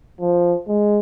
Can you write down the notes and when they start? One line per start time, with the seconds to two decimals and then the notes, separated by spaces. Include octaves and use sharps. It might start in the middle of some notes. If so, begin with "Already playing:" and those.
0.20 F3
0.68 G#3